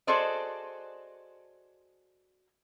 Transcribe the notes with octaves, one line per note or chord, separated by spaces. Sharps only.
F#4 G#4 A4 C5 D5 D#5